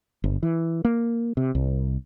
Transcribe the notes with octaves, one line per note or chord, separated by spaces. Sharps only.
G1
E3
A#3
C3
C2